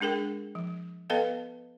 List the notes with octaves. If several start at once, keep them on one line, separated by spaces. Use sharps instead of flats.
G#3 D4 G#4 A#4 G5
F3
B3 A4 B4 D#5 F5 G5